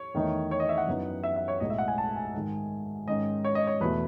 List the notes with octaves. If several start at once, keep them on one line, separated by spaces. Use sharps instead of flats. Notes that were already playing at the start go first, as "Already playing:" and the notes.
Already playing: C#5
E2 D#3 A3 D#4
C#5
D#5
E5
F#5
F#2 E3 B3 D#4
E5
E5
C#5
B1 A2 G#3 D#5
E5
F#5
G#5
A5
G#5
G#2 D#3 G#3
G#2 D#3 G#3 C#4 D#5
C#5
D#5
C#5
E2 B2 A3 B4